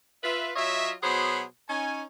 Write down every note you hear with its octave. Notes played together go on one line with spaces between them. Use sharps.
F4 B4 E5
F#3 F4 C#5 D#5 E5
B2 F#3 G#4 C5 F#5 B5
C#4 D#4 G#5